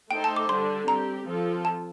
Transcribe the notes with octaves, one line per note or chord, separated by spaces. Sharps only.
A3 D#4 A4 C5 G5
A5
D6
D3 G3 D4 C6
G3 C4 G4 A#5
F3 C4 F4 A4
A5